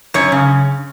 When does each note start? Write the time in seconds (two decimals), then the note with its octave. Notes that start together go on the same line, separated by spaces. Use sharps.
0.14 F#2 C#5
0.32 C#3